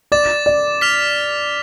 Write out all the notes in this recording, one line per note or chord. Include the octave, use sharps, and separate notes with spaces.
D5 D6 A6 E7
D5
F6 B6 F7